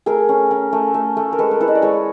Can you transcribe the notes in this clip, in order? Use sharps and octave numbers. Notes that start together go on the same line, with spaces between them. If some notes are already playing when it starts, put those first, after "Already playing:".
A3 G#4 A#4
C#4
C#4
A3
A3
A3
A#4
G#3 A4 B4
A#4
E4 A4 B4
D#5
D5
G#3 B4 C#5